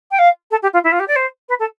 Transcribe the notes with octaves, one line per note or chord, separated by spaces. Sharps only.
G5
F5
A4
G4
F4
E4
F4
G4
D5
C5
B4
A4